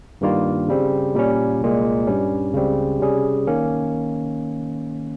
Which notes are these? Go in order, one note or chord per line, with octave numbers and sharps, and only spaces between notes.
G2 D#3 G3 A#3 F4
C#3 G3 C4
A#2 G3 C#4
C2 A#2 G#3
G2 G3 C#4
C#2 C#3 G3 C4
C3 G3 C#4 G#4
D#3 A#3 C#4